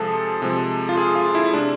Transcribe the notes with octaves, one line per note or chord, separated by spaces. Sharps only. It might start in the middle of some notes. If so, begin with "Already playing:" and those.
Already playing: C3 F3 G#3 G#4 A4
C3 F3 G#3
F4
G#4
F4
E4
C3 G#3 D4